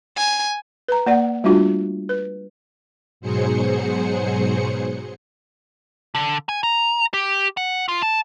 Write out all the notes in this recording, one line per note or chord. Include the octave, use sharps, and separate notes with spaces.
G#5
B4 A#5
A#3 D5 F#5
G3 A3 D4 F4 F#4
B4
G#2 B2 F#3 G#4 C5 C#7
D3
G#5
A#5
G4
F#5
F4
A5